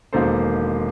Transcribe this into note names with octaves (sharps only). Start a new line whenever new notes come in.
E1 D#3 A#3 A4 C5